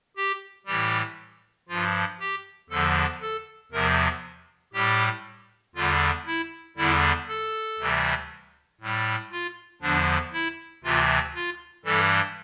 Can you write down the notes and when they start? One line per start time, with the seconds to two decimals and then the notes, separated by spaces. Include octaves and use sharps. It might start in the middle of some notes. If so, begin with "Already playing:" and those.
0.16 G4
0.66 A2 E3 G3 G4
1.68 G2 F3 F4
2.20 G4
2.70 E2 D3 F3 A4
3.21 A4
3.72 E2 C3 F3 A#4
4.73 A2 G3 G4
5.75 E2 D3 G3 F4
6.26 E4
6.77 E2 D3 G3 E4
7.28 A4
7.78 D2 C3 E3 G3
8.81 A2 G3
9.31 F4
9.82 E2 D3 F3 D4
10.32 E4
10.84 D2 C3 E3 F4
11.34 F4
11.85 G2 E3 G3 A4